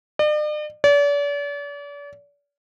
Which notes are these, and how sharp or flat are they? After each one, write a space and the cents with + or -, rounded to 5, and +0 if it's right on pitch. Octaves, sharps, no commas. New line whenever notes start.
D5 +45
D5 -40